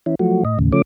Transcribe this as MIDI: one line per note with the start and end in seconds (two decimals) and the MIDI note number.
0.06 0.15 52
0.06 0.15 61
0.06 0.15 64
0.19 0.43 53
0.19 0.43 54
0.19 0.43 57
0.19 0.43 66
0.45 0.59 45
0.45 0.59 75
0.59 0.72 39
0.59 0.72 45
0.59 0.72 49
0.72 0.82 49
0.72 0.82 53
0.72 0.82 57
0.72 0.82 61
0.72 0.82 86